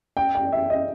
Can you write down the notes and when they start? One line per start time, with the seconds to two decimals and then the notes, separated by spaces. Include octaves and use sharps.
0.17 G5
0.35 G5
0.52 E5
0.70 D#5